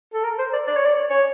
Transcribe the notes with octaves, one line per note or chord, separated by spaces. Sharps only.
A4
A#4
C5
D5
D5
C#5
D5
C#5